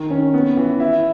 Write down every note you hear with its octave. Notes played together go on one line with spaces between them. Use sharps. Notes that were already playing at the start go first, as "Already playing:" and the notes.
Already playing: D#3
C#4
B3
E3
E4